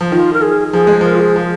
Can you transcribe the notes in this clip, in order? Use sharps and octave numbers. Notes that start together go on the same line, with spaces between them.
F3
D#3 F4
A#4
G#4
F3 G#4
G#3
F3 A#4
F4
G#4
F3